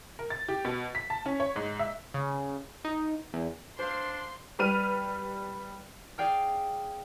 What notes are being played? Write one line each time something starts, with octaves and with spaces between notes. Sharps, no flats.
A#4
A6
G4
B2
B6
A5
C#4
C#5
G#2
E5
C#3
D#4
E2
D4 C5 F5 C6
G3 B4 F6 D#7
G#4 D5 F5 G5 F6